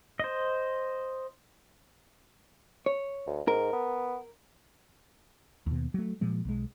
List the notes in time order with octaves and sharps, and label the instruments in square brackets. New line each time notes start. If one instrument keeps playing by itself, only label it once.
[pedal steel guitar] C5 D#5
[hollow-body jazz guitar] C#5
[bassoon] D2
[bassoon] G#2 [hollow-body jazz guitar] A#4
[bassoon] B3
[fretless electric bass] D#2 B2
F#3 A3
A#2 F3 G#3
B1 G#3